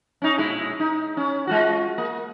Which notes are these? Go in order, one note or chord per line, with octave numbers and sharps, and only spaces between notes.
C#4 D#4
A#2 G#3 E4
D#4
C#4
G#3 F4 F#4
A#3